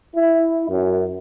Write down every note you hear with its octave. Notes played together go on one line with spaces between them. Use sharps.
E4
F#2